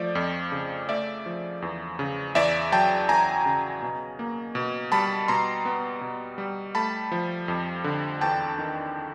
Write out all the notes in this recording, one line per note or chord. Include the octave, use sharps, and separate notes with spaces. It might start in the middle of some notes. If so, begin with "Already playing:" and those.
Already playing: F3 A3 D5
F2
C#3
A3 D5 E5
F3
E2
C#3
E2 D5 E5
F#3 G5 A5
E2 G#5 A#5
C#3
B2
A#3
B2
G3 A5 B5
B2 A#5 C6
B3
B2
G3
A3 A5 B5
F3
F2
D3
E2 G5 A5
D#3